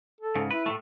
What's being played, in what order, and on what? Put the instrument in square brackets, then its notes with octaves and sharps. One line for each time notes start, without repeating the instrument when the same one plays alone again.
[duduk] A4
[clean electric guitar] G#2 C#3
[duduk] E4 [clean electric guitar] B4
[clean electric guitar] A2 F3 A3